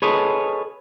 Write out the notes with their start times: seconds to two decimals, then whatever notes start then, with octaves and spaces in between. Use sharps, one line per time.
0.02 G#4 A4 B4 C#5 D#5